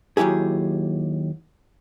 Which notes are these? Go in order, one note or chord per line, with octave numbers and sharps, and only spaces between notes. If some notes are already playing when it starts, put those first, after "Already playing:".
D#2 F#3 E4 G4 G#4